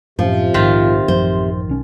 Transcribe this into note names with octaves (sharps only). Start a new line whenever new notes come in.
F#2 A2 C3 F3 C#4
A#1 G#2 D#3 F4 E5
A1 F#2 F3 C5
B1 C#4